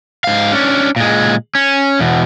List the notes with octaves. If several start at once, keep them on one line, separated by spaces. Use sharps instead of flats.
G#2 F5
C#4 D4
A#2 G#3
C#4
E2 B2